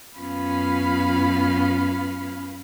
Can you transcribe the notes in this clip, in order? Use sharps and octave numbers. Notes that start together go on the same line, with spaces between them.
F#2 B3 C#4 F4 F5 B5